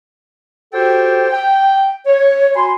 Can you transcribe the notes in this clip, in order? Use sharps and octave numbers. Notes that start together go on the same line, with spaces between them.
F#4 G4 A4 C5 G5
G5
C#5
F#4 G#5 B5 C6